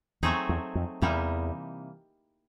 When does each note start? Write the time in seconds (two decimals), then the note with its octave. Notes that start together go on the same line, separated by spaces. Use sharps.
0.23 E2 F#3 A3 C4 D#4 G#4
0.49 E2
0.75 F2
1.02 E2 C3 E3 G3 A#3 D#4